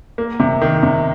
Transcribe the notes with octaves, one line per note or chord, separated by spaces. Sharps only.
A#3
C3
D#3
C3